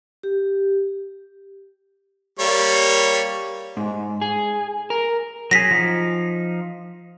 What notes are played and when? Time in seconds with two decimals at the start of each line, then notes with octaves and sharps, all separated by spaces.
0.23 G4
2.39 G3 A#3 C#5
3.77 G#2
4.21 G#4
4.90 A#4
5.51 F#3 G#4 A#6 B6
5.71 F3 D#4